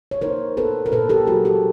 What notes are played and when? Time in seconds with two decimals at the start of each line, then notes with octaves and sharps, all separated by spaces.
0.11 C#5
0.21 D#4 A#4 C5
0.57 B3 A4 B4
0.86 A#4
0.92 A#2 A4 B4
1.09 G4 A4
1.27 F#3 F#4 G#4
1.45 G4 A4